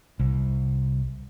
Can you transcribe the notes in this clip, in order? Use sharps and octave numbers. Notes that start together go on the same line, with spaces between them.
C2